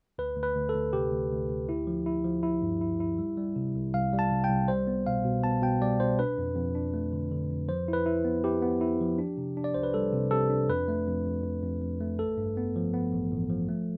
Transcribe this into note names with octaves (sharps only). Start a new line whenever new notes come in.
D2 B4
D2
B4
D2
A4
D2
C3 G4
D2
D2
D2
E4
F3
E4
F3
E4
G2
E4
E4
G3
G3
C3
C2
C2 F5
G3
A5
C3
G5
C2
G3 C5
B3
B2 F5
B2
B3 A5
B2 G5
G3 D5
B2 C5
D4 B4
F2
F2
D4
A3
D3
D3
F2
F3 C5
E4
B4
E4
B3
E4 G4
B3
E4
F3
D4
C3
D4
D5
C2 C5
B4
G3 A4
C3
C3 A4
D4
F2 B4
A3
F2
F2
F2
F2
F2
A3
A1 A4
G2
B3
F3
B3
A1
A1
F3
A3